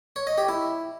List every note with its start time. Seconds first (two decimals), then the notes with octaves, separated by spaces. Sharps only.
0.16 C#5
0.27 D#5
0.38 G4
0.49 E4